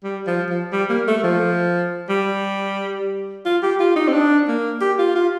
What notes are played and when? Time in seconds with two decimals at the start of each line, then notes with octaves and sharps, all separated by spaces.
0.04 G3
0.27 F3
0.49 F3
0.72 G3
0.89 A#3
1.07 A3
1.23 F3
2.09 G3
3.45 F4
3.62 G4
3.80 F4
3.96 D#4
4.08 C4
4.14 D4
4.48 A#3
4.81 G4
4.98 F4
5.15 F4